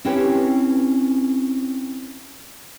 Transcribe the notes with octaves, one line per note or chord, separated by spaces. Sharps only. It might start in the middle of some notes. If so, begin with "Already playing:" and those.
C4 C#4 E4 G4 B4 C#5